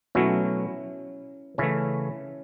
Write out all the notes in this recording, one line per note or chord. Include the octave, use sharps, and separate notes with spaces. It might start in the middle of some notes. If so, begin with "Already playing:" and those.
B2 F#3 A3 C#4 E4
C#3 E3 A3 C#4 E4